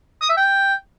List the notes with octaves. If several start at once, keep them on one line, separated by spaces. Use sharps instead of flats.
D#6
E5
G5